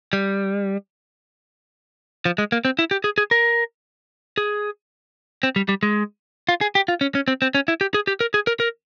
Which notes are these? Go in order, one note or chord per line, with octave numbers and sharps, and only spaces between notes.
G3
F3
G#3
A#3
C4
E4
G4
G#4
G#4
A#4
G#4
C4
G3
G3
G#3
F4
G#4
G4
F4
C#4
C#4
C4
C4
C#4
E4
G4
G#4
G4
A#4
G#4
A#4
A#4